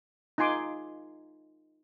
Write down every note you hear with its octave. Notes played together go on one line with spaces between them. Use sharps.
D#4 F4 G#5 C6 D6